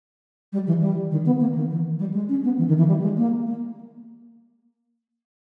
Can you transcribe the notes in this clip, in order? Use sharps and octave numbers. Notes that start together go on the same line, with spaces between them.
G3
E3
G3
D#3
B3
A#3
D#3
E3
G3
G#3
C#4
B3
E3
D#3
E3
G3
G#3
A#3
A#3